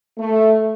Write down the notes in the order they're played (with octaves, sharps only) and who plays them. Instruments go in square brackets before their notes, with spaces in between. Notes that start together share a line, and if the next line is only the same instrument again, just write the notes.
[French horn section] A3